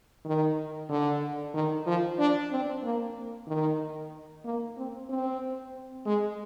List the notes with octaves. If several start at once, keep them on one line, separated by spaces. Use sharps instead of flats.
D#3
D3
D#3
F3
D4
C4
A#3
D#3
A#3
C4
C4
G#3